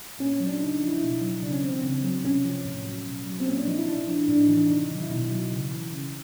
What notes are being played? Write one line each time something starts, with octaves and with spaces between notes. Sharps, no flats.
A#2 C#4
C#4
F#3
D4
C#3 D#4
D#4
F3
E4
B2 D#4
F#3
C#3 D4
C#4
E3 C4
C4
C#3
F#3
C3 C#4
F3
A2
F#3
B2
F#3
C4
A#2 C#4
D4
F3 D#4
E4
C3 D4
F3
A2 D4
D#4
E3 D4
D4
C3 D#4
D#3 F#3
E4
B2 D#4
F#3
C#3
E3
C#3